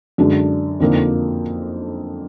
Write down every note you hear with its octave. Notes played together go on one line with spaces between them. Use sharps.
F#2 D3 G#3 D4
F2 D3 F3 A#3 D#4